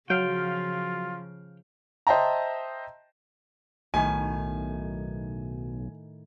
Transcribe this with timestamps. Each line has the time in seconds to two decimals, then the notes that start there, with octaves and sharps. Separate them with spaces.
0.10 C#3 F3 F#3 F4 F5 G5
2.07 C5 D#5 E5 G5 A5 A#5
3.94 B1 A2 D#3 G#5